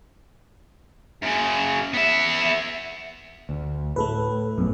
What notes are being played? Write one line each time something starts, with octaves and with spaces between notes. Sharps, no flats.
F#2 C#3
B3 E5
D2
A2 A3 A4 B4
A#1 F#2 B3